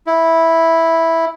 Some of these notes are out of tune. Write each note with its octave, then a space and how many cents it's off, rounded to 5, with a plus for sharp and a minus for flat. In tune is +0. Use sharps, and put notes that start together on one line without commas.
E4 -5